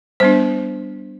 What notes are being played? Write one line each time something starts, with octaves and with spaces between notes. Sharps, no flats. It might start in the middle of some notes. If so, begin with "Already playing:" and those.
G3 B3 D4 C5